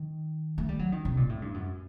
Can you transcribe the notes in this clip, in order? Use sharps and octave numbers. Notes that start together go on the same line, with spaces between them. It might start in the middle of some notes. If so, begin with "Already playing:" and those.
Already playing: D#3
A3
G3
F#3
D#3
C3
A#2
A2
G2
F#2